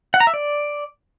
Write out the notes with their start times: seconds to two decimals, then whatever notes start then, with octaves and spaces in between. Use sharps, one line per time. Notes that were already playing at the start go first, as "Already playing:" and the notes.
0.14 F#5
0.20 A#5
0.27 E5
0.34 D5